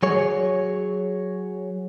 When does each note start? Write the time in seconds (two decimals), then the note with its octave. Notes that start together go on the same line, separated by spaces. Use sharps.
0.03 F#3 G#4 C#5